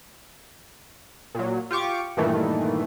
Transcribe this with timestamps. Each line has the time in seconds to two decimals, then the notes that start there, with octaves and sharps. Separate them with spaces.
1.35 A#2 F#3
1.71 F4 G4 C#6 D6
2.17 G2 A#2 D#3 E3 A3